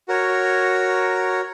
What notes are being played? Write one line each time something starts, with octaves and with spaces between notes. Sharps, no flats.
F#4 A#4 C#5